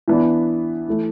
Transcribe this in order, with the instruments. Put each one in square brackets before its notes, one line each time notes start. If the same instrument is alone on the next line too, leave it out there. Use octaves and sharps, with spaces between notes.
[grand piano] E3 B3 D4
E3 A3